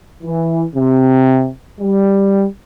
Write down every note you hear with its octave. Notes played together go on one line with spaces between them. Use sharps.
E3
C3
G3